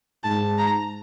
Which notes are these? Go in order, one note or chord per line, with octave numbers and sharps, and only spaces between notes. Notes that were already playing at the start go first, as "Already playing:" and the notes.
G#2 A5
A#5